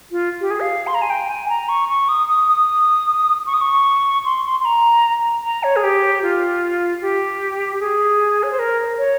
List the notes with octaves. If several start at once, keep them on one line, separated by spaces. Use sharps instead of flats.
F4
G4
G#4
F5
C6
A#5
G#5
G5
G#5
A#5
C#6
C#6
D#6
D#6
D#6
C#6
D#6
C#6
C6
C6
C6
A#5
A#5
C#5
G#4
G4
F4
G4
G#4
C#5
C5
A#4
C#5